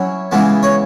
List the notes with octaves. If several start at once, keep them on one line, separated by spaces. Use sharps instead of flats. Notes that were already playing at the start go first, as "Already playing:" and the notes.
Already playing: F#3 C#4 E4 C#5
C#3 E3 G#3 B3
C#5